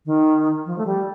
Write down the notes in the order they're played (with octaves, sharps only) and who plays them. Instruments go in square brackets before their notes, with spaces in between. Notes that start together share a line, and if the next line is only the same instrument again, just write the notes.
[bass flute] D#3
F3
A3
G3